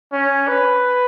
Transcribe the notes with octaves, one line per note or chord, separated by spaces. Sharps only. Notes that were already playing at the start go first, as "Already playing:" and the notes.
C#4
B4